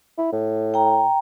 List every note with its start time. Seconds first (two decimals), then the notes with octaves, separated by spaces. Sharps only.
0.18 E4
0.32 A2
0.74 G5 A#5